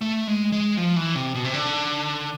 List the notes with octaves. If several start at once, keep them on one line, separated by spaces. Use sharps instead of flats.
A3
G#3
G#3
F3
E3
C3
B2
C3
D3